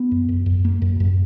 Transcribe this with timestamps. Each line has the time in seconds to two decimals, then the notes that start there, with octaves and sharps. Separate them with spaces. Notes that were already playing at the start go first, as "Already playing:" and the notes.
Already playing: B3
0.11 F#2
0.29 F#2
0.46 F#2
0.65 A#3
0.82 F#2
1.00 F#2